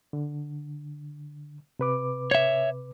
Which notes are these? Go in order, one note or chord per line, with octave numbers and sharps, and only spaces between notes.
D3
C3 B4 D6
C#5 E5